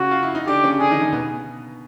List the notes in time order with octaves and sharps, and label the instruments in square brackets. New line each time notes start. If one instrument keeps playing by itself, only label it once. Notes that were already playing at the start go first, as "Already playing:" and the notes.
Already playing: [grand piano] C#3 C#4 [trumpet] F#4
[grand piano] F4
E4
D#4
[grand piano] D3 D4 [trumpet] G4
[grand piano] C#3 C#4
[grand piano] D3 D4 [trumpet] G#4
[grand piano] D#3 D#4
D#3 D#4
B2 B3